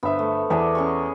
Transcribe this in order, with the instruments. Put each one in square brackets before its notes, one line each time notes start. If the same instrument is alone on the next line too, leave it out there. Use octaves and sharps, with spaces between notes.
[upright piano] G1 E5 [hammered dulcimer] B3 C5
[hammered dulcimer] A3
[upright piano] E2 B3 E5 [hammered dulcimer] G#4 D5 A5
[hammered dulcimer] C#4 G#4 C#6